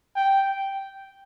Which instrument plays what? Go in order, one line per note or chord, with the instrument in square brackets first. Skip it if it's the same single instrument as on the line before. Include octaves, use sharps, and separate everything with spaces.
[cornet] G5